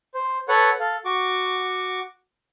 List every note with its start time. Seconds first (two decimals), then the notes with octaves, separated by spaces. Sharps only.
0.14 C5
0.48 A4 B4 C#5 F#5
0.80 A4 F5
1.05 F#4 C#6 D6